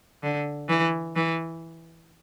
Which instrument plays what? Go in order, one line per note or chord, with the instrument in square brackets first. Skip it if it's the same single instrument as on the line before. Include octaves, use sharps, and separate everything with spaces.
[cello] D3
E3
E3